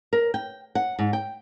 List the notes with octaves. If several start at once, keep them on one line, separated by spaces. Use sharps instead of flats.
A#4
G5
F#5
G#2
G5